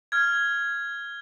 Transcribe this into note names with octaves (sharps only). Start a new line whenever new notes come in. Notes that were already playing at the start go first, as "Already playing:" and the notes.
F6 G#6